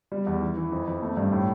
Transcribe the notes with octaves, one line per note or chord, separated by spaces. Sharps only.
G3
E2
E3
E3
F2
F2
A3
G2
A2